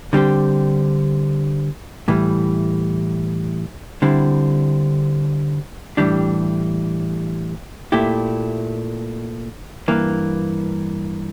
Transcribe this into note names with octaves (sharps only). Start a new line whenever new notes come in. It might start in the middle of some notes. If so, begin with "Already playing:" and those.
D3 G3 C4 G4
A2 E3 G3
D3 G3 C4 E4
A2 E3 G3 D4 G4
A#2 A3 E4 G4
G2 E3 A#3